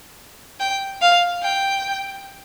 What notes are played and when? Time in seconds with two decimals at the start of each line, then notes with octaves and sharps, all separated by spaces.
0.60 G5
1.02 F5
1.43 G5